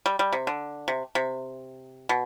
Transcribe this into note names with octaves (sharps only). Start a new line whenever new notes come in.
G3
G3
C3
D3
C3
C3
B2